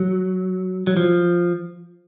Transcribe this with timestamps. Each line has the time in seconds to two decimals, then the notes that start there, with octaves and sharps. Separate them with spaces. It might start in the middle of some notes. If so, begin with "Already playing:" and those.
Already playing: F#3
0.87 F#3
0.97 F3